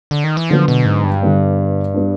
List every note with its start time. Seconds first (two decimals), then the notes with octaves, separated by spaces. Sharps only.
0.11 D3
0.24 D#3
0.37 E3
0.50 D3 F3 F#3 B3
0.68 B2
0.86 G#2
1.04 G2
1.22 D3 G3 B3
1.94 G3 B3 D4